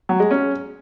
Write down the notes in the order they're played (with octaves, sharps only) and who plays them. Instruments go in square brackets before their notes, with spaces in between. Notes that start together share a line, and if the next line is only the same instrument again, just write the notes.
[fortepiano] F#3
G#3
C#4